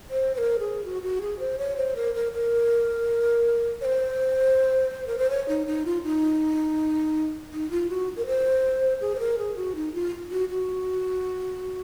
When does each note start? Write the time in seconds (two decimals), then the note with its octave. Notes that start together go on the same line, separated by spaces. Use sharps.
0.10 C5
0.34 C5
0.38 A#4
0.59 G#4
0.84 F#4
1.03 F#4
1.21 G#4
1.39 C5
1.58 C#5
1.77 C5
1.96 A#4
2.14 A#4
2.33 A#4
3.81 C#5
3.85 C5
5.07 A#4
5.18 C5
5.30 C#5
5.48 D#4
5.67 D#4
5.86 F4
6.03 D#4
7.52 D#4
7.71 F4
7.90 F#4
8.17 A#4
8.27 C5
9.01 G#4
9.15 C5
9.19 A#4
9.38 G#4
9.56 F#4
9.75 D#4
9.94 F4
10.31 F#4
10.49 F#4